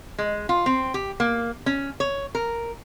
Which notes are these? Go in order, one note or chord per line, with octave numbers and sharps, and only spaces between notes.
G#3
F4
C4
G4
A#3
C#4
C#5
A#4